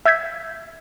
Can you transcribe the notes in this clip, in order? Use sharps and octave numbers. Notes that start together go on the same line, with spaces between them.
E5 E6 G6 G#6 B6